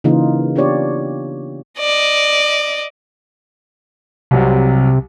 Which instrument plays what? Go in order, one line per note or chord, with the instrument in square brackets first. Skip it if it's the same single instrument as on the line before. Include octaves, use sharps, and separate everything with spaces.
[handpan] C#3 E3 A#3 D#4 F4
B3 D4 F4 G4 C#5 D5
[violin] D5 D#5
[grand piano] C2 F#3 [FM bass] C3